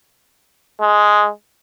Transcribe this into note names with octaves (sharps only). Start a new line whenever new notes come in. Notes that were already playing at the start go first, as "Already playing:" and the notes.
G#3